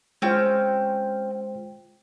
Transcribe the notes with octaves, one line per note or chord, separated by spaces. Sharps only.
G#3 C4 C#4 F4 C5 G5